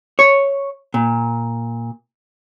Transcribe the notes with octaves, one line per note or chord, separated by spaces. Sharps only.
C#5
A#2